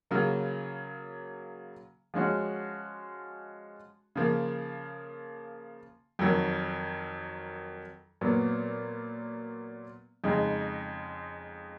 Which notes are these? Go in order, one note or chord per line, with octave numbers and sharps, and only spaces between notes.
C#3 F#3 A#3 F4
F3 G#3 C#4 F#4
C#3 F3 A#3
F2 D#3 F#3
A#2 F#3 B3
F2 C#3 G#3 D#4